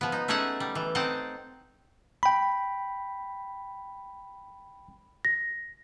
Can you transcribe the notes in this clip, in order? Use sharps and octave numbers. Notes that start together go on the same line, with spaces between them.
F3 B3
D#4
A3 C#4 D#4 G#4 E5 F#5
G3
E3
C4 D#4 F#5 A5
G5 B5
A#6